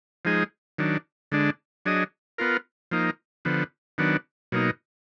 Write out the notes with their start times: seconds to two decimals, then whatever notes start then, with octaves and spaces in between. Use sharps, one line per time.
0.25 F3 G#3 D#4 G#4
0.79 D#3 F#3 D4
1.32 D3 G#3 D4
1.86 F#3 D4 G#4 D#5
2.38 B3 F4 A#4
2.91 F3 A#3 D#4
3.45 D3 F3 B3
3.98 D#3 F#3 B3 D4
4.52 B2 F#3 A#3 D#4